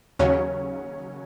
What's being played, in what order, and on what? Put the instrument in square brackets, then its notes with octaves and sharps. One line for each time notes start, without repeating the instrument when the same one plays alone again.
[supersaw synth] D#2 C#3 F#3 C#4 [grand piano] C#5